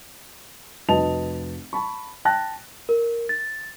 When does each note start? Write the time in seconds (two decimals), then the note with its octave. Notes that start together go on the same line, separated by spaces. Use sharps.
0.89 F1 F#4 B4 D#5 A5 F7
1.73 A5 B5 C#6
2.25 G5 A5 F#6 A6 A#6
2.89 A#4
3.29 A6